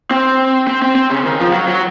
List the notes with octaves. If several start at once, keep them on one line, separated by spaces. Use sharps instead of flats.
C4
C4
C4
C4
C#3
D#3
F3
F#3
F#3